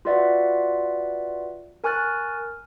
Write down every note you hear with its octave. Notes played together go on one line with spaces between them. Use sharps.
F4 F#4 B4 D5 E5 F#5
A#4 G#5 C#6 F6 F#6 A6